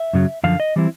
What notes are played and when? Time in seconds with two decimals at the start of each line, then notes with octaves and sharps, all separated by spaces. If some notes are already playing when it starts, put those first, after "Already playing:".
Already playing: E5
0.13 F#2 C#3 F#3
0.44 F#2 D3 F3 F5
0.60 D#5
0.76 E3 G3 C4 E4